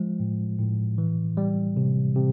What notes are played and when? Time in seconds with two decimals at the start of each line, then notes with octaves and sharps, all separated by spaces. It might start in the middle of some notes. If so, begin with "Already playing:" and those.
Already playing: F3 G#3
0.20 A2
0.59 A2
0.98 E3
1.37 G3
1.77 C3
2.16 C3